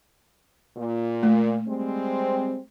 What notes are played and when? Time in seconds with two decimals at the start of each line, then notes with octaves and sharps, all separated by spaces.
0.77 A#2
1.23 A3
1.67 G3 G#3 C4